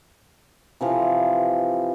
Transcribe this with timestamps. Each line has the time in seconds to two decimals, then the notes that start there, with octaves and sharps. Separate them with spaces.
0.81 C3 E3 F3